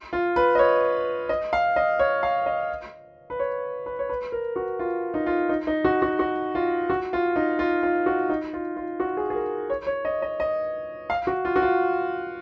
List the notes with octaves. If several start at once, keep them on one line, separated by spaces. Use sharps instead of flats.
F4
B4
D#5
C#5
D#5
F5
D#5
C#5
F5
D#5
B4
C#5
B4
C#5
B4
A#4
F#4
F4
D#4
F4
D#4
D#4
F#4
F#4
F#4
F4
F#4
F4
D#4
F4
F4
F#4
D#4
F4
F4
F#4
G#4
G#4
A#4
C#5
C#5
D#5
D#5
D#5
F5
F#4
F4
F#4
F4